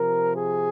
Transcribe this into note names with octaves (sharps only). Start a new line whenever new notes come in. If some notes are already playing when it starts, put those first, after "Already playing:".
Already playing: C3 F3 A#4
G#4